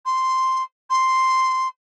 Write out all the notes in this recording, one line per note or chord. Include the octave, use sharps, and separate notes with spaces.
C6
C6